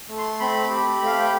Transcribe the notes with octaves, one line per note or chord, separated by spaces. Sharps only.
A3
C6
C4 B5
G4
A3 F5
G5